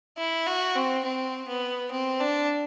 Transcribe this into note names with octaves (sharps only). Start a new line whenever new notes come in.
E4
F#4
C4
C4
B3
C4
D4